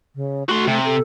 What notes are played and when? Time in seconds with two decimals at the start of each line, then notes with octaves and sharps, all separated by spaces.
0.15 C#3
0.49 A3 F#4 C6
0.68 C3
0.84 A4